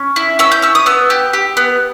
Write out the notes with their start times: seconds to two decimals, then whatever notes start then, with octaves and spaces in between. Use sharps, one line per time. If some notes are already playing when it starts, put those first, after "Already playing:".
Already playing: C#4
0.16 E4
0.39 C#4 E6
0.52 G6
0.62 C#4 E6
0.75 D#6
0.86 B3 E6
1.10 G4
1.33 G4
1.57 B3